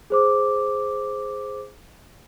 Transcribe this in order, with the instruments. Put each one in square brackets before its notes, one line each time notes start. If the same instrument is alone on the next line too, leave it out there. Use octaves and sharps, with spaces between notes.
[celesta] G#4 C5 D6